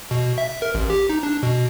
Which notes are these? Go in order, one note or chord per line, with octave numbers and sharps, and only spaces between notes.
B2
E5
A#4
A1
G4
D#4
D4
B2